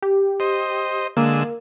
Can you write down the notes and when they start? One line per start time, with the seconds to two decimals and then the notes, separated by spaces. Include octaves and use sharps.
0.02 G4
0.40 C5 D#5
1.17 D3 G#3 A#3 E6